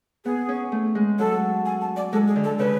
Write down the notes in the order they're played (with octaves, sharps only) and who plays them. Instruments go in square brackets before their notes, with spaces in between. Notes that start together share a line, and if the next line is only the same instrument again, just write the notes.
[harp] B3 [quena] G#4
[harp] C#4
A3
G#3
[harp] F#3 [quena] A4
[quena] G#5
A5
D5
[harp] G#3 [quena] A4
[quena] G#4
[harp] D3
[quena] A4
[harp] C#3 [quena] B4